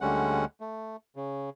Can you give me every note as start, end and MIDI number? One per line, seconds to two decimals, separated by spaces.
0.01 0.45 38
0.01 0.45 50
0.01 0.45 55
0.01 0.45 56
0.01 0.45 61
0.01 0.45 78
0.60 0.96 57
1.16 1.50 49